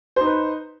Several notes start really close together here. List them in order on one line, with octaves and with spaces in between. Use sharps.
C5 D#4 B4